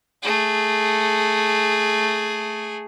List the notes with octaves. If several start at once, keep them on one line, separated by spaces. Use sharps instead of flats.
A3 G#4